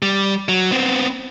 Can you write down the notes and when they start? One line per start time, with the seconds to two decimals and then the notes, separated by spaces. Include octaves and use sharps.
0.02 G3
0.49 F#3
0.71 B3 C4